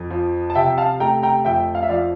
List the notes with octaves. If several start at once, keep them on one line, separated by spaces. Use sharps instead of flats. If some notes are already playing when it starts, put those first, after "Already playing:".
Already playing: F2
F3
A5
C3 E5 G5
F5 A5
A3 G5 A#5
G5 A#5
F2 E5 G5
F5
E5
F3 D5 F5